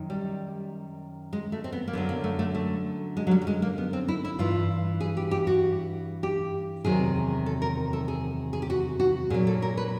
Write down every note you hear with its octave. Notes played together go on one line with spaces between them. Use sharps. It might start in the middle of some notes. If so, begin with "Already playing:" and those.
Already playing: F#2 D#3
G3
G#3
A3
C4
B3
A#3
F#2 D3 F#3 B3
A#3
A3
A3
A3
G#3
F#3
G3
G3
G#3
A#3
B3
C4
E4
E4
G2 E3 F4
G#4
G4
G4
F#4
G4
E2 C3 D#3 F#3 G#4
A4
A#4
A4
G#4
G#4
G4
F#4
F#4
A#2 F#3 G#4
A4
A#4
B4